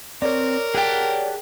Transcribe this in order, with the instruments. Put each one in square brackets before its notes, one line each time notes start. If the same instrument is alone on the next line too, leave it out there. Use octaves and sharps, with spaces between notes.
[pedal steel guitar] C4 [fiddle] A#4 [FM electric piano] C#5 D5
[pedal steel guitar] G4 F#5 A5 [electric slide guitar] G#4 G5